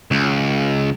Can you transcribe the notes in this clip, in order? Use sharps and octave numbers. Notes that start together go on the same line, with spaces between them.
C#2